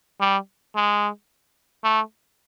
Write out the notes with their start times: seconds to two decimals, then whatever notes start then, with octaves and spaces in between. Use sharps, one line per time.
0.21 G3
0.76 G#3
1.84 A3